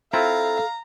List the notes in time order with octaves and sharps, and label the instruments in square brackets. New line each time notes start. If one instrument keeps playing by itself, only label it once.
[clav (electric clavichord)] C4 E4 F4 [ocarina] A4 [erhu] F5 [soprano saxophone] A#5